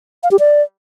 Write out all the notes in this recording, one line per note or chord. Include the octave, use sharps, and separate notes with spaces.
F5
G4
D5